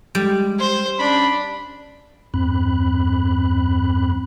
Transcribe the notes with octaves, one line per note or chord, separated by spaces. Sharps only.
G3 G#3
C5
C#4 D4 B5
E2 G2 C4 B5 F#6